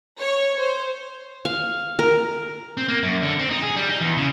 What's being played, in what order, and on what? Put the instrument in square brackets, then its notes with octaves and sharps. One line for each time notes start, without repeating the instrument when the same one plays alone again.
[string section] C#5
C5
[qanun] F5
A#4
[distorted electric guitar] C4
A#3
F#2
D3
C4
D#4
G#4
G3
D#4
E2
C#3